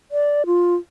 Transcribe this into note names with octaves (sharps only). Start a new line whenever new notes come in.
D5
F4